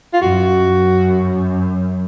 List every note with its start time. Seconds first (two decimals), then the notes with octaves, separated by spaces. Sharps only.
0.14 F4
0.21 F#2 F#4
0.66 F#2